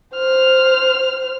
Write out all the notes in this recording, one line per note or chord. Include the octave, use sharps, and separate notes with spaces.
C5 F6